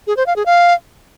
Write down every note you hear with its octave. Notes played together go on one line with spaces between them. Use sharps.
G#4
C5
F5
G#4
F5